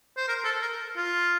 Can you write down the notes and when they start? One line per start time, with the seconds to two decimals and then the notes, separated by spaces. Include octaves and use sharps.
0.17 C5
0.28 A#4
0.45 A4
0.62 A#4
0.97 F4